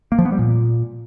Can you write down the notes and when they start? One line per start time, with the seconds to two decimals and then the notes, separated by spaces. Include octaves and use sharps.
0.12 A#3
0.19 F3
0.25 B3
0.32 G3
0.39 A#2